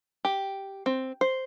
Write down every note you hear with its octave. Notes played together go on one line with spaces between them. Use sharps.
G4
C4
C5